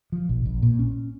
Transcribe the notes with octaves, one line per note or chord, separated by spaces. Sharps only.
F3
A#1
A#1
A#2
C#4